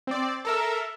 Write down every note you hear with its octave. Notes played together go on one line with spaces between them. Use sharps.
C4 D5
A4 A#4 E5